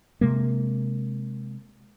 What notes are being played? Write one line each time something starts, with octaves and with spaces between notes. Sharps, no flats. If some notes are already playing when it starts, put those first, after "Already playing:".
C3 G#3 A#3